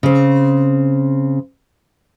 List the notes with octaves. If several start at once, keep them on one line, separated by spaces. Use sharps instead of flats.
C#3 C4